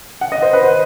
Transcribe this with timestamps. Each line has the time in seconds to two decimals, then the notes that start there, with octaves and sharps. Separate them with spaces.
0.21 F#5
0.32 D#5
0.42 C5
0.53 B4
0.64 C5